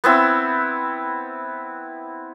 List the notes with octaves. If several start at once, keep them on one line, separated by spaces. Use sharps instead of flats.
B3 C4 E4